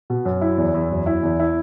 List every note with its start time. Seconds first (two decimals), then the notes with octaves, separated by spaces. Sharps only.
0.10 B2
0.25 F#2
0.41 E4
0.57 E2
0.74 E2
0.91 F#2
1.06 E4
1.23 E2
1.39 E4